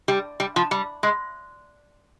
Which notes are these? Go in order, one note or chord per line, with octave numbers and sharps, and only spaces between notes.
G3
G3
F3
G3
G#3